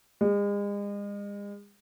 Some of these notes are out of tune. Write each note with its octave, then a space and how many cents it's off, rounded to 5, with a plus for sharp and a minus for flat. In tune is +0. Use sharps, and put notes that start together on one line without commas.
G#3 -40